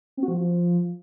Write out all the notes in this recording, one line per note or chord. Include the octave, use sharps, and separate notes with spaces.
C4
F#4
F3